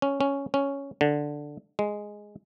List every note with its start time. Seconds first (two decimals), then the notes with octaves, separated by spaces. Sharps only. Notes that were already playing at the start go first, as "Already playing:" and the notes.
0.02 C#4
0.21 C#4
0.54 C#4
1.01 D3
1.79 G#3